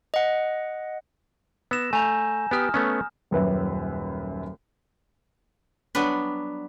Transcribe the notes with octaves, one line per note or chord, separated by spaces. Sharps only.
D#5 F#5
B3 E6 A#6 E7
A3 G#5 A#5 G6
B3 G4 D#6 F6
A3 B3 C#4
D#1 F#2 B4 E5
F#3 G3 B3 D4 B4